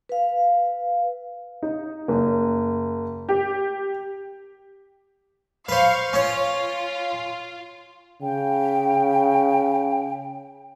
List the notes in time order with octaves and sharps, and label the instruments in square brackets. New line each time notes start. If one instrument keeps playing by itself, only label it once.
[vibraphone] B4 F5
[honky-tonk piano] D#4
F#1
G4
[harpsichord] B4 C5 [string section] F5 C#6
[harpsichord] C#4 C#5 [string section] F4
[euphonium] C#3 [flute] G5